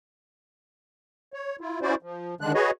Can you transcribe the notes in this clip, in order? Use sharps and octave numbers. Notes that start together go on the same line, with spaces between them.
C#5
E4 F4
C#4 E4 F#4 C5 D5
F3
D3 D#3 G#3 D4 F#6
F#4 G#4 B4 C#5 D#5